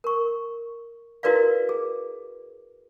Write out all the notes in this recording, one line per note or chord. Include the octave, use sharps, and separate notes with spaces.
A#4 C#6
E4 F#4 A#4 B4 D5 F5
G#4